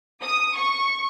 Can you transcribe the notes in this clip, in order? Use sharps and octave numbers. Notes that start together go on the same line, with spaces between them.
D#6
C#6